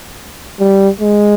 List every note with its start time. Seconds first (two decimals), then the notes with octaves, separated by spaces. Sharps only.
0.60 G3
1.01 G#3